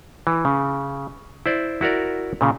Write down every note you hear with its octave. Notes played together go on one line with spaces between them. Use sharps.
E3
C#3
E4 C5 D5
E4 F#4 A#4 D5
A#2 C#3